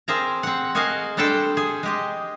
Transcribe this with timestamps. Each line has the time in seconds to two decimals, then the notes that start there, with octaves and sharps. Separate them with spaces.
0.08 C4 G#4 A#4 A5 A#5
0.43 C4 F#5
0.75 F#4 G#4 A#4 D#5 F5 G#5
1.17 G3 D4 G4 A4 C5 G5
1.57 G#4
1.83 G#3 G4 D#5